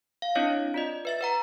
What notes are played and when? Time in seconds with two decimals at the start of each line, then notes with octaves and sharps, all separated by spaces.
0.22 F5
0.35 C4 D4 E4 C#5 D#5 F5
0.74 F4 D5 D#5
1.05 B4 E5 A6
1.21 B4 F#5 A#5